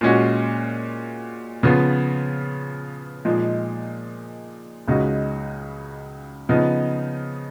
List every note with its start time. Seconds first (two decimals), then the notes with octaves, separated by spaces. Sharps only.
0.01 A#2 G#3 C#4 F#4
1.63 C#3 F3 B3 F4
3.25 A#2 F3 G#3 D#4
4.88 C#2 C#3 G#3 D#4 F#4
6.49 C#3 F3 B3 D#4